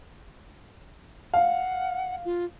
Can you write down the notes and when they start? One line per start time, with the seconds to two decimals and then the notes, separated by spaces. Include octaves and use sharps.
1.34 F5 F#5
2.25 F4